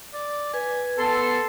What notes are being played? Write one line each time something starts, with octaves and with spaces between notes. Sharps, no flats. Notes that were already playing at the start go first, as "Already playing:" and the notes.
D5
B4 G#5
B3 A4 C6